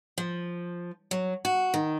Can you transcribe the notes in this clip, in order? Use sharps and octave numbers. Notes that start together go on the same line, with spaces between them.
F3
F#3
F#4
D#3